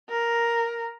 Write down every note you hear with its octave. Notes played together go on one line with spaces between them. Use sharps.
A#4